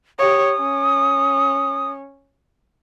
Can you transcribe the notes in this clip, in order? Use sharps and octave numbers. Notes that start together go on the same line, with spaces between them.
G4 C#5 D#6
C#4